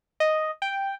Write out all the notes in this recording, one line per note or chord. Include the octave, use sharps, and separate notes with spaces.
D#5
G5